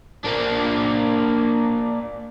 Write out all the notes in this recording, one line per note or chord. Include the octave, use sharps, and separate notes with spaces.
A#3 D4